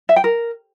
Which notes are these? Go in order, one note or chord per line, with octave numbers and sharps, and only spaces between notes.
E5
G5
A#4